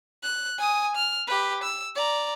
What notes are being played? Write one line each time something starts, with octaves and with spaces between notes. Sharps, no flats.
F#6
G#5 D#6
F6
G4 B4
E6
D5 A#5